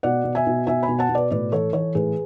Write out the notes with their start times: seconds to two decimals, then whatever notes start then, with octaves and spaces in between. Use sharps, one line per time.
0.03 B2 D5 F#5
0.24 B2
0.35 E5 G#5
0.47 B2
0.67 B2 E5 G#5
0.83 G#5 B5
0.89 B2
0.99 F#5 A5
1.09 B2
1.15 B4 D5
1.30 A2 B4 D5
1.52 E3 A4 C#5
1.73 E3 A4 C#5
1.95 A2 G#4 B4